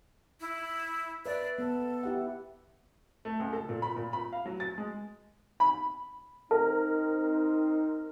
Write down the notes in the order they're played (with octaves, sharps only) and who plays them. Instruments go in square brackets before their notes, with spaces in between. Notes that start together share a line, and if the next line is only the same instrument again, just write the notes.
[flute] E4
[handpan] B4 E5 [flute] D5
[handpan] B3 [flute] A4
[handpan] E4 G4 F#5
[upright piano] A3
C#2
A4
A#2
B5
A#2
B5
F5
F#3
A6
G#3
[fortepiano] B5
[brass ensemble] C4 D#4 [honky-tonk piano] A#4